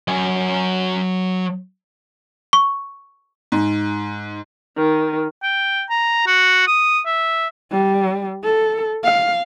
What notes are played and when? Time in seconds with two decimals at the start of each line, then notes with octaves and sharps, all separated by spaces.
0.08 F#3 G#5
2.53 C#6
3.52 G#2
4.76 D#3
5.43 G5
5.90 A#5
6.27 F#4
6.67 D#6
7.06 E5
7.72 G3
8.45 A4
9.04 F5